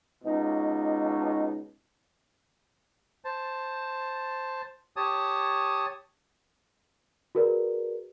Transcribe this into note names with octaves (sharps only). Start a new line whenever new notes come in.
C#2 B2 D#4
C5 A5
G4 C#5 A5 D#6
F#4 G#4 A#4 B4 D5